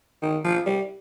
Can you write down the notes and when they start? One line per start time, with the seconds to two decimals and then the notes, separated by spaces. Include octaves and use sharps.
0.22 D#3
0.44 F3
0.66 G3